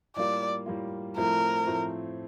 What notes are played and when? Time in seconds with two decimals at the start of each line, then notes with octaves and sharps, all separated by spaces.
0.16 A2 G3 A#3 F4 D5
0.66 A2 G3 A#3 F4
1.17 A2 F3 A3 C4 A#4
1.67 A2 F3 A3 C4